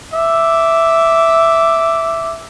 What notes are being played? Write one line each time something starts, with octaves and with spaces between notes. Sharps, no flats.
E5 D6